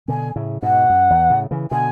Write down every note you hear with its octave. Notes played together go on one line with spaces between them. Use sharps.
B2 D3 G#5
A2 C#3
G#2 B2 F#5
F#2
E2
A2 C#3
C#3 E3
B2 D3 G#5